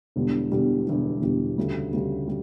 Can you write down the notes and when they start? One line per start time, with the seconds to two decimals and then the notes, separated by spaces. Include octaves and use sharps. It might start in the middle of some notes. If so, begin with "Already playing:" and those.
0.16 E1 E2 D3 G3
0.52 E1 E2 D3 G3
0.87 E1 E2 D3 G3
1.22 E1 E2 D3 G3
1.58 D2 C#3 G3
1.93 D2 C#3 G3
2.28 G3